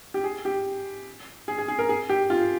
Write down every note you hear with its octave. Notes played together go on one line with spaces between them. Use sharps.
G4
G#4
G4
G#4
G#4
G#4
A#4
G#4
G4
F4